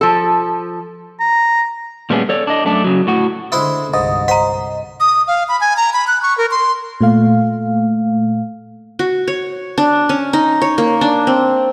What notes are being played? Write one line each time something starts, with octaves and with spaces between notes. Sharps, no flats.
F3 A4
A#5
A#2 G3 A3 B3 C#4 G#4
A4 C#5 D5
D4 D#5
F#2 A3 D4
C#3 F#3
A2 F#4
D3 G#3 E4 C5
G1 C2 G#2 D#5
C5 F#5 A#5
D#6
F5
B5
G#5
A#5
B5
F#6
C#6
A#4
C6
A#2 A3 F5
F#4
C#5
D4
C#4
D#4
C#5
A#3
D4
C4